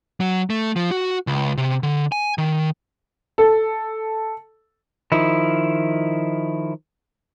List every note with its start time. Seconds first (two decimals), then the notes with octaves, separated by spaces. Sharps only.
0.20 F#3
0.50 A3
0.76 F3
0.91 F#4
1.27 C#2
1.57 C3
1.83 D3
2.12 G#5
2.38 D#3
3.38 A4
5.12 D#3 F3 E4